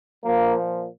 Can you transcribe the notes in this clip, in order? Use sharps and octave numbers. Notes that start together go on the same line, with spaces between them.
A#2 F3 A#3